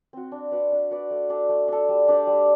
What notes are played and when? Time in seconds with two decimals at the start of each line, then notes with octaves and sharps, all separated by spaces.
0.13 C4 F#4
0.32 D4
0.51 F#4 B4 D5
0.72 D4
0.91 F#4 B4 D5
1.11 A3
1.30 D4 A4
1.49 A3
1.68 D4 A4
1.89 G3
2.08 D4 G4 D5
2.27 G3